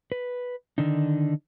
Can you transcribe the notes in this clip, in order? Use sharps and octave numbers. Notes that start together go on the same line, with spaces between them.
B4
D3 D#3 D4 D#4